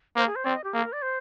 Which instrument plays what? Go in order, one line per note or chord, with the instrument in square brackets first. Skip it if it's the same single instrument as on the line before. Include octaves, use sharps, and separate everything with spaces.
[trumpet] A#3 [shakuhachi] C5
[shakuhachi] G#4
C5
[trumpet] C4 [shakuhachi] D5
[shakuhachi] D#5
G4
[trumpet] A#3 [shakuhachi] G#4
[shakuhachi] A#4
D5
C5